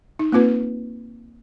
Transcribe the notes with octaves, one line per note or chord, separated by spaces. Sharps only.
D#4
A#3 C4 F4 B4